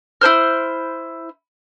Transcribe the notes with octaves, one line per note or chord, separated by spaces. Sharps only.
E4 A#4 C5 F6